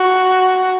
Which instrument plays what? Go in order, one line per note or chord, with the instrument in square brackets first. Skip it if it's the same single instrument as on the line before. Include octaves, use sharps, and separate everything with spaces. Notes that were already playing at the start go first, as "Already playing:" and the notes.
Already playing: [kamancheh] F#4